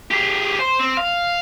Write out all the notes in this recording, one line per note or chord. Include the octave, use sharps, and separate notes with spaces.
G4 G#4
C5
C4
F5